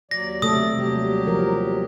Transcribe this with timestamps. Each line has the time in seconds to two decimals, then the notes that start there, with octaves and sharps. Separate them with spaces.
0.11 D#2 F#3 D5 A#6
0.42 C3 A3 A4 D#6
0.78 D#2 F#3 G3 G4
1.27 F3 A#4